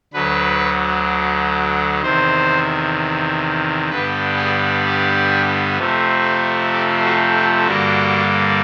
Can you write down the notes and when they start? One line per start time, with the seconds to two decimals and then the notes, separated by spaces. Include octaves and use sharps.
0.13 D2 D3 F#3 B4
2.02 E2 C3 D#3 C5
3.90 G2 D3 G3 B3 B4
4.37 G#4
4.85 G4
5.78 F2 C3 F3 A3
6.73 G4
7.04 F#4
7.36 F4
7.66 G2 D3 G3 A#3 F#4